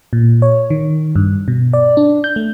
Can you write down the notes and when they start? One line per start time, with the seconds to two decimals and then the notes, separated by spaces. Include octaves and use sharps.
0.13 A#2
0.42 C#5
0.70 D#3
1.16 G2
1.48 B2
1.73 D5
1.97 D4
2.24 G6
2.36 A3